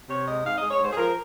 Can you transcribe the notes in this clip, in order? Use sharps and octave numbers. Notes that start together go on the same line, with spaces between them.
C3 C#5
G#3 D#5
G#2 F5
G#3 D#5
C#5
G#2 C5
G#4
F3 A#4